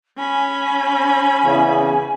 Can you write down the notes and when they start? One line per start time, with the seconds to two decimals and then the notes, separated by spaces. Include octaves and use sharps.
0.18 C#4 G#5 B5
1.45 E2 C#3